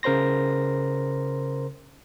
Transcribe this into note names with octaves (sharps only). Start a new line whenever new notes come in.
C#3 A#4 C5 C6 A#6